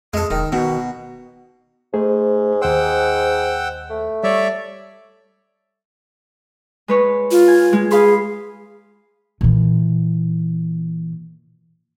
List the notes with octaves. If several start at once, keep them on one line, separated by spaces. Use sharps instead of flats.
F2 G#3 A4 D#6
E1 D#3
B2 D#3 F#4
G#2 A3 G#4 C5
D#2 C5 F#5 G5 E6
A3
G3 C#5 D5 E5
G#3 B4 C#5
F4
G#5
G#3
G#4 F5 B5 C6
A#2 E3